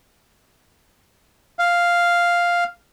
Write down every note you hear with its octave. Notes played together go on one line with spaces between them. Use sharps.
F5